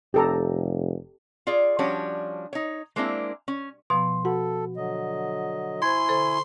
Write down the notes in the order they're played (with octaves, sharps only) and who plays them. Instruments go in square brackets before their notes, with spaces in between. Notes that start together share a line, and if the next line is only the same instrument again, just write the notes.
[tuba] F1 [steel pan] G4 A4 A#5
[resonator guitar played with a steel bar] F4 G#4 D5
F3 G3 C#4 D4 F#4 C#5
D#4 C#5
G#3 A#3 C4 D4 E4
C#4
[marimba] B2 F3 B3 [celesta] C6
[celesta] F#4 [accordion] A4 [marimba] F#5
[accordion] D3 F#3 D#5
[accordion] E4 G#5 [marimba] C5 G#6 [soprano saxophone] C6
[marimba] D3 A4 C5